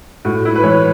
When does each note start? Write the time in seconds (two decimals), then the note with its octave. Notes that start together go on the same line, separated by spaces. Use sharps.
0.25 A2 F#4
0.45 E4
0.56 B4
0.63 E3 C#5